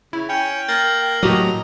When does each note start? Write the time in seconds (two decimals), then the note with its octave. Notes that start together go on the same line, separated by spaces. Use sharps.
0.13 C#3 E4
0.29 C#4 G5
0.69 A#3 A6
1.23 A2 F#3 F#4 G4 D#5 A#5 D#6